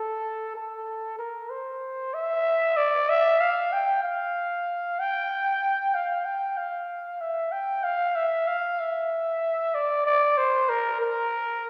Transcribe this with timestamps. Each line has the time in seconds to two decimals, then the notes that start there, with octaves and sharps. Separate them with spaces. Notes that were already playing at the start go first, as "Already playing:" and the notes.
Already playing: A4
0.55 A4
1.19 A#4
1.50 C5
2.14 E5
2.77 D5
3.09 E5
3.40 F5
3.73 G5
4.03 F5
4.99 G5
5.94 F5
6.25 G5
6.57 F5
7.21 E5
7.52 G5
7.84 F5
8.15 E5
8.47 F5
8.79 E5
9.75 D5
10.06 D5
10.38 C5
10.69 A#4
11.01 A#4